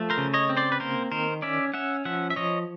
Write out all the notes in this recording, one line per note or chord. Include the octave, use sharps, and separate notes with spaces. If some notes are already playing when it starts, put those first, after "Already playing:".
Already playing: F3 A3
A#4 C5
C#3
C#5 D#5
C4
C5 D5
B4
A#3 A#4 C5
D#3 A#4 C5
C#4 D5 E5
C#4 E5 F#5
F3 E5 F#5
E5
F3 C#5 D#5